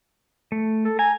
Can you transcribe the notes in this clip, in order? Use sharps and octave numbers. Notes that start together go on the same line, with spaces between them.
A3
A4
G#5 A#5